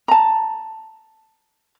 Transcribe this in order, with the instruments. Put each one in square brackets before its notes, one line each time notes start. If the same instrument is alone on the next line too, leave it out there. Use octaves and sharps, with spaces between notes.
[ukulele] A5 A#5